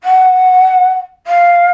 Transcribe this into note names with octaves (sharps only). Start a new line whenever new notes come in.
F#5
F5